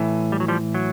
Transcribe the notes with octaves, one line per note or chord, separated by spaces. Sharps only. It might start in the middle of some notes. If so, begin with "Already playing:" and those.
Already playing: A2 E3
G3
F#3
F3 G3
F#3